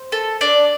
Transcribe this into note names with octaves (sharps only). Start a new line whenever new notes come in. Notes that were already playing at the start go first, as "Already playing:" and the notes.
Already playing: C5
A4
D4 D5